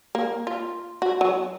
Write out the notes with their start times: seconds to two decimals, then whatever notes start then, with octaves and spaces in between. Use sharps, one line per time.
0.15 A#3
0.47 F4
1.02 F#4
1.21 F#3